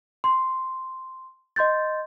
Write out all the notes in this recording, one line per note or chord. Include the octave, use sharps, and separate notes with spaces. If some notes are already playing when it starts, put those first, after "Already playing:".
C6
D#5 C6 G6 A6